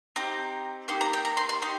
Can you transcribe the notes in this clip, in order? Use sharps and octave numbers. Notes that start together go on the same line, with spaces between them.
C4 D#4 G4 A#5
A#3 D#4 G4 C6
A#5
G5
A#5
C6
C6
D#4 G4 C6